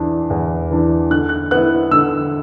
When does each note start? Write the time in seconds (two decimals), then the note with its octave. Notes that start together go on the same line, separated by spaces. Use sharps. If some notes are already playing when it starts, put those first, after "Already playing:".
Already playing: E2 E3 D4
0.30 E2
0.71 E3 D4
1.11 D3 F#6
1.29 F#6
1.51 B3 E4 F#6
1.91 D3 E6